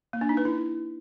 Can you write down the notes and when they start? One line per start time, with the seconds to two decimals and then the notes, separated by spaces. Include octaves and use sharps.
0.13 A#3
0.21 D4
0.29 D#4
0.37 B4
0.45 E4